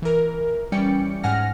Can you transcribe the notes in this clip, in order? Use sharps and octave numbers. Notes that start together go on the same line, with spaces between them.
E3 A#4
E3 G3 C#4 D5 G5 C#7
G#2 F#5 G#5 F6 A#6